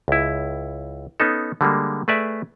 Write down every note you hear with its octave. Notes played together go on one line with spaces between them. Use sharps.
C#2 E4
B3 C#4 D#4 A4
D3 G3 G#3 A#3
A3 G#4 B4 D5 E5 A5